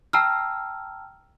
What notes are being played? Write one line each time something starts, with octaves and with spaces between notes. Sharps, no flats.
G5 A5 A#5 E6 F6